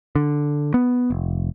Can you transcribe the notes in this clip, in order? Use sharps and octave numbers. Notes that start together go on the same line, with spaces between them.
D3
B3
F1